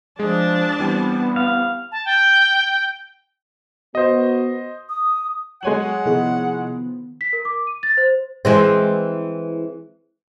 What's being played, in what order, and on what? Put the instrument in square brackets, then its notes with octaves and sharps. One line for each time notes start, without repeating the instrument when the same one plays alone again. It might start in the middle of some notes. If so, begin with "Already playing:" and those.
[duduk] F3 [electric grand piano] G#3 G#4 [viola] D4 A5
[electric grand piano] E3 G3 C4 [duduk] B3
[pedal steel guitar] F5
[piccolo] A5
G5
[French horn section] B3 [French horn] F#4 [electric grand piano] C5 D#5
[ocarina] D#6
[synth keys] F#3 G#5 C6 [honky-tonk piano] G#3 C#5 F#7 [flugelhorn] F#5
[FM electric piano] C3 E4 G#4 [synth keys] D#3 F3 B3
[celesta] B6
A#4
D6
D#7
A6
C5
[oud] E3 G#3 C4